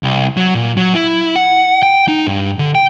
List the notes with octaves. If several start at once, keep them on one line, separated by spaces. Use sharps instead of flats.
C2
F#3
A#2
F#3
E4
F#5
G5
D#4
G2
D3
G5